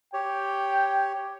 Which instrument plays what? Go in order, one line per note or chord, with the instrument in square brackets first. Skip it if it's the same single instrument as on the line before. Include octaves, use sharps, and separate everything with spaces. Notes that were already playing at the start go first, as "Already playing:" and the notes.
[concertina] G4 C#5 [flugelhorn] G5